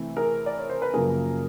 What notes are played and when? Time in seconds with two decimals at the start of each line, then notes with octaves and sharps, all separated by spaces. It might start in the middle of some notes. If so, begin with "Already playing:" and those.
Already playing: C3 E3 A3 C4
0.17 G#4 A#4
0.46 D5
0.58 C#5
0.70 C5
0.82 B4
0.93 F#2 C#3 F3 A#3 G#4 A#4